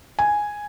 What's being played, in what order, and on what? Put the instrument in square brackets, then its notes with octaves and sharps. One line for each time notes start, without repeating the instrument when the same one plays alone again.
[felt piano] G#5